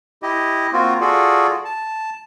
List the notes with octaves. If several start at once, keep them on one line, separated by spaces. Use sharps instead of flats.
E4 G4 D#5
A#3 C4 F4 F#4
F4 F#4 G#4 A4 D5
A5